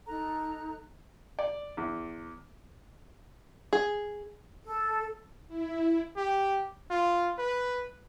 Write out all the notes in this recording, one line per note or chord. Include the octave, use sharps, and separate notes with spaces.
D#4 A4 A#5 F#6
D5
E2
G#4
A4
E4
G4
F4
B4